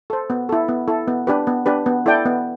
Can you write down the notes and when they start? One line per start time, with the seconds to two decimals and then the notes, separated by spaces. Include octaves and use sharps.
0.10 A4 C5
0.30 B3
0.49 E4 A4
0.68 B3
0.88 E4 A4
1.08 B3
1.27 D4 G4 B4
1.47 B3
1.66 D4 G4 B4
1.86 B3
2.06 E4 A4 D5 G5
2.26 B3